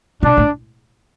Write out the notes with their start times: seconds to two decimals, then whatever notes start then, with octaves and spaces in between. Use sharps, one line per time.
0.23 B2 D4
0.37 A2